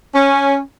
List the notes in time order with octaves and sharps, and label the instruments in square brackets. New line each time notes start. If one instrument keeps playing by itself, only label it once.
[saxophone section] C#4